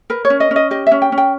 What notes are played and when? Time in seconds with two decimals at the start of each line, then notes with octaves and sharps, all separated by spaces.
0.10 A#4 B4
0.25 C#5
0.30 C#4
0.40 D#5
0.51 C#4
0.56 D#5
0.71 G4 D#5
0.87 C#4 E5
1.02 G5
1.12 C#4
1.18 G5